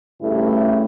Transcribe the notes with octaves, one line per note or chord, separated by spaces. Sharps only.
G2 C#3 A3 E4